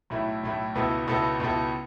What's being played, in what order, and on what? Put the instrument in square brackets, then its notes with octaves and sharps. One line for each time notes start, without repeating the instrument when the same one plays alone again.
[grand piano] B1 A2 A3 E4
B1 A2 A3 E4
C#2 B2 B3 E4 A4
C#2 B2 B3 E4 A4
C#2 B2 B3 E4 A4